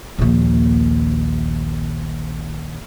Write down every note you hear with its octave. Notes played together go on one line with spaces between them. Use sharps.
A#1 D#2